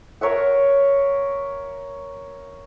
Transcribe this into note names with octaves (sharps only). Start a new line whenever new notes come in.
A#4 C#5 E5 F#5